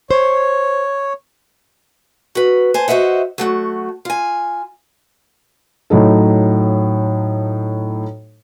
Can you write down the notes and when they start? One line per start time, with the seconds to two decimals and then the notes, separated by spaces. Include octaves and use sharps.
0.11 C5 C#5
2.35 F#4 B4
2.74 C5 G#5 A5
2.88 F#4 C5 D#5 E5 F#5
3.38 F#3 A3 F#4
4.05 F4 G#5
5.90 A2 F#3 D#4 A4